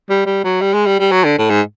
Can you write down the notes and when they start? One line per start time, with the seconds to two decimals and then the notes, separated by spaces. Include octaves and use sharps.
0.09 G3
0.26 G3
0.44 F#3
0.61 G3
0.73 G#3
0.86 G3
0.99 G3
1.11 F#3
1.24 D3
1.38 A2
1.50 G#2